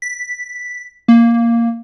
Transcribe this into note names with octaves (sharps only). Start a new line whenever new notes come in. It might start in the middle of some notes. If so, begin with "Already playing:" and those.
B6
A#3